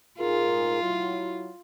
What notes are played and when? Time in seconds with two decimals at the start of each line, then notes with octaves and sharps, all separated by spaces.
0.20 G#2 F4 G#4 A#4
0.83 F#3 E4